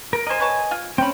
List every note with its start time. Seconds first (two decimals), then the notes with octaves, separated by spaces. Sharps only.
0.13 A#4
0.27 A#4 C5 D#5 G#5
0.40 B4 C#5 A5
0.71 F4
0.98 C4 C#4 G5 B5